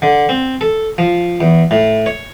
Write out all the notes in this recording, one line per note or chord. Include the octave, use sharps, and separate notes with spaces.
D3
C4
A4
F3
E2
A2
C#5